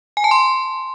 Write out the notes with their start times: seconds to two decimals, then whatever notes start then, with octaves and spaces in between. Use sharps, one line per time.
0.17 G#5
0.24 A5
0.31 C6